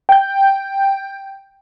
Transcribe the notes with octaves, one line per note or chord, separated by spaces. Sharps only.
G5 G6